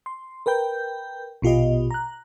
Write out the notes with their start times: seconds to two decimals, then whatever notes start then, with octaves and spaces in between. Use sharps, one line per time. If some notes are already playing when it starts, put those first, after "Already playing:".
0.06 C6
0.46 A#4 B4 G5 G6
1.42 A#1 B2 F4 G4 D#5
1.91 A#5 F#6